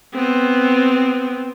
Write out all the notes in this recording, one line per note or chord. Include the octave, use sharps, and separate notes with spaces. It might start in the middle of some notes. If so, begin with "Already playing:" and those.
B3 C4